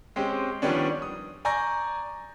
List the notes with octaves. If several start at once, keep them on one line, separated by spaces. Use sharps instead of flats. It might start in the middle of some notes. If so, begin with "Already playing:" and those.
G#3 C4 C#4 G4
D#3 F3 G3 B3 C#4 D4
D#6
D5 G#5 A#5 C#6 G6 A#6